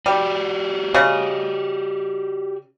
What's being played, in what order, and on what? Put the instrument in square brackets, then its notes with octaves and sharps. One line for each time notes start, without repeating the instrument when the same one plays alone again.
[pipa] G3 [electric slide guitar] F#4 G4 D5
[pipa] C#3 [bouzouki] D#5